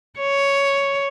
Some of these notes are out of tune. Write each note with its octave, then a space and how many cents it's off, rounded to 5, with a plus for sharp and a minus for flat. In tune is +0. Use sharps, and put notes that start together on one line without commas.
C#5 +5